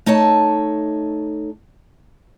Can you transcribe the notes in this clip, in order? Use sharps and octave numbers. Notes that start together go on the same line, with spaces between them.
A3 D#4 A4 C#5 A5